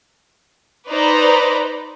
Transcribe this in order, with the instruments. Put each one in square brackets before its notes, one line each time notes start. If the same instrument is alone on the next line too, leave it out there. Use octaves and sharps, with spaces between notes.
[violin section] D#4 B4 C5 D5 A#5 B5